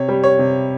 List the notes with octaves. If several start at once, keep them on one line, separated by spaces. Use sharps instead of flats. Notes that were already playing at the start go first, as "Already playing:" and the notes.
Already playing: C3 C#5
G3
C#5
C3